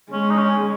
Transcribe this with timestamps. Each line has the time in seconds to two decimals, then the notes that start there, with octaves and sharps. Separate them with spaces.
0.12 G#3 C#4
0.30 D#4
0.38 C#4